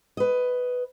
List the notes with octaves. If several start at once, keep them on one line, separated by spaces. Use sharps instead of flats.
B4 D#5